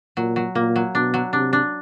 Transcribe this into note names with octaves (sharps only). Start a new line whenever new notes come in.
A#2 F#3
F#3
A#2 A#3
F#3
B2 D4
F#3
C3 D4
D4